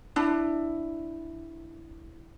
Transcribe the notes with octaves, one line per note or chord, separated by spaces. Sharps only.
D4 E4